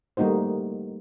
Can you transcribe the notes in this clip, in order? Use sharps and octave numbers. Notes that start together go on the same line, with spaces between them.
G3 A3 A#3 D#4 F#4 C5